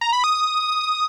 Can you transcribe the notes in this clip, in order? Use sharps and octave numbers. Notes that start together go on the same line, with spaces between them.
A#5
B5
D#6